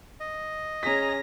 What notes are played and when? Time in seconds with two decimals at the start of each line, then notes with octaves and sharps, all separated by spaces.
0.20 D#5
0.83 C#4 G#4 A#5 A#6 B6